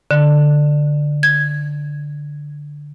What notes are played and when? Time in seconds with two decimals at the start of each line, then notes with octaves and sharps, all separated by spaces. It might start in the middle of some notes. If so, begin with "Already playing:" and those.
0.11 D3
1.23 G#6